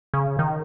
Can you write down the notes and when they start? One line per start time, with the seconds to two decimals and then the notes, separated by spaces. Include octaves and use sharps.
0.14 C#3
0.39 D#3